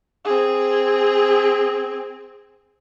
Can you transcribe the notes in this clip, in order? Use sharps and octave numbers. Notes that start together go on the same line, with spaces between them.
C4 G#4